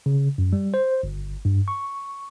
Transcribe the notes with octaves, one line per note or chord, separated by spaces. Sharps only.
C#3
F#2
G3
C5
G1
G2
C#6